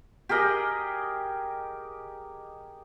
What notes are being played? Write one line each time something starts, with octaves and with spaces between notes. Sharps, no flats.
G4 G#4 A#4 D#5